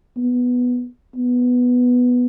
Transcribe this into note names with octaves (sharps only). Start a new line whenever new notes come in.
B3
B3